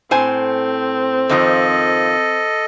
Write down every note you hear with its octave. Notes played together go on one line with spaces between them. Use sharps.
A2 C4 C5 G#5
F2 D#3 F3 A4 D#5